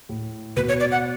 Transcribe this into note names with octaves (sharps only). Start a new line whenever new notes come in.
A2
B2 B4
C#5
D5
F#5